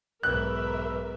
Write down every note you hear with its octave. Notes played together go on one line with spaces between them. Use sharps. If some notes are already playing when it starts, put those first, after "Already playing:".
B1 G#2 A#4 B4 E5 F#6